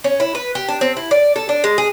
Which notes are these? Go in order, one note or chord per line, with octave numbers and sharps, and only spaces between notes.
C#4
E4
B4
G4
D4
C4
E4
D5
A4
D4
G#3
G#4